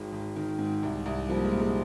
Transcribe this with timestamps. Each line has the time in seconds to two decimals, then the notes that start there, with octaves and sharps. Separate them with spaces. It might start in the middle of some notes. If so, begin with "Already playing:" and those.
Already playing: G#1 D#3 G#3
0.12 G#1
0.36 D#3
0.59 G#2
0.83 C2
1.06 C2
1.29 F3 G3 A#3
1.45 G#3
1.53 A#2
1.60 G#3